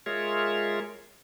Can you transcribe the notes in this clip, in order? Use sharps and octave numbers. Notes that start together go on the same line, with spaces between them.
G#3 F4 G#4 A#4 C#5 E5